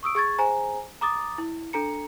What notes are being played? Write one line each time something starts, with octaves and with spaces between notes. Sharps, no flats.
C#6 D#6 E6 D7
G#4 C#6 G#6 A6
G#4 C5 G#5 A#5
A#5 D6 D#6 A6
E4
D4 A4 A#5 C#7